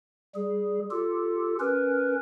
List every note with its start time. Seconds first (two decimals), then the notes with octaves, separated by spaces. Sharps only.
0.35 G3 G#4
0.91 F4 G4 A4
1.60 C#4 A#4 B4